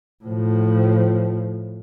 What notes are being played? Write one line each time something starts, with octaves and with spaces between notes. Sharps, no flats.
A2 F3